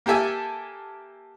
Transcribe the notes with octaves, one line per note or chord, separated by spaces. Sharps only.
A#3 G4 A4 E5 G#5